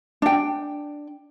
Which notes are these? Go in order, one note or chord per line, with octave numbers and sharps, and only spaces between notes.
D4 G5